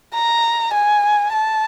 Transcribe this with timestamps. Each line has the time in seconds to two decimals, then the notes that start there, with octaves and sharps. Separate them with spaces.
0.14 A#5
0.73 G#5
1.33 A5